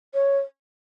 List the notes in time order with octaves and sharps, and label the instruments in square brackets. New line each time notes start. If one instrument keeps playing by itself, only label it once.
[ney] C#5